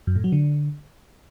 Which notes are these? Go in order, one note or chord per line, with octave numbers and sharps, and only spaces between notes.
F#2
A2
F#3
D3